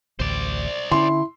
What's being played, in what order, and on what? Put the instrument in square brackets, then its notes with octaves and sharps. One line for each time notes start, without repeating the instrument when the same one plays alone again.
[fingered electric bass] A1 D2 [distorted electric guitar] C5 D5
[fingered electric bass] D3 C#4 [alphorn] E4 [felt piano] C6